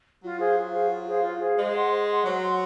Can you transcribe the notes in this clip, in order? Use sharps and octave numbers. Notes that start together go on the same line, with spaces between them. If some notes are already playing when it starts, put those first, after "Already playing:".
F#3 F4
G#4 C5 F5
F4
G#4 C5 F5
F4
G#4 C5 F5
F4
G#4 C5 F5
G#3 C5
F#5 C6
C5
F#5 C6
F#3 C5
F#5 C6